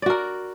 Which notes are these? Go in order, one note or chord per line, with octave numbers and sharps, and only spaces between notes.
F#4 A#4 D5